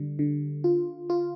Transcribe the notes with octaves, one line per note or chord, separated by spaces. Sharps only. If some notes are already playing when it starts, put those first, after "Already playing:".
Already playing: D3 G3
D3
F4
F4